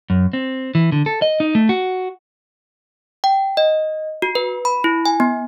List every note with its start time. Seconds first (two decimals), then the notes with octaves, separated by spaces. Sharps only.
0.10 F#2
0.33 C4
0.75 E3
0.92 D3
1.06 A4
1.22 D#5
1.40 D#4
1.55 A3
1.69 F#4
3.24 G5
3.57 D#5
4.22 F#4
4.35 B4
4.65 B5
4.84 E4
5.06 G#5
5.20 B3